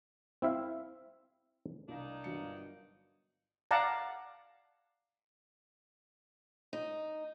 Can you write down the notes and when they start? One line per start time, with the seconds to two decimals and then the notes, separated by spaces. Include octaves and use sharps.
0.42 C4 E4 E5 F5
1.88 C2 A#3 D4 D#4
2.24 G1 F#3 C#7
3.71 D5 F5 F#5 A5 A#5
6.73 D#4